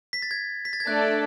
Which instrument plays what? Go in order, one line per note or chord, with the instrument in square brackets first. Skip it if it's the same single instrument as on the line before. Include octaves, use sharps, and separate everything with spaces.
[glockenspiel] B6
A6
G#6
B6
A6
G#6
[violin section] A3 D4 A4 D5 [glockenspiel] F#6